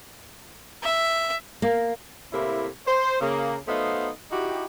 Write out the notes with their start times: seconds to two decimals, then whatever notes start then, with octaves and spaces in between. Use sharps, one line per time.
0.83 E5
1.62 A#3
2.32 A2 C3 A3 A#3 E4
2.86 C5
3.20 C#3 A#3
3.67 F#3 A3 B3 D#4 C5 F5
4.31 D#4 E4 F#4 G4